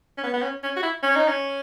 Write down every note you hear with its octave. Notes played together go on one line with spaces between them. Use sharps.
C#4
B3
B3
C#4
C#4
F#4
E4
C#4
D#4
C#4